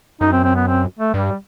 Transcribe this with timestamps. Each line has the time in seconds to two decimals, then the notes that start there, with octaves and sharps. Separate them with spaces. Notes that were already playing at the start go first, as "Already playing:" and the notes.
0.21 F#2 D#4
0.32 C4
0.44 C4
0.56 B3
0.67 C4
0.99 A3
1.14 G2 G3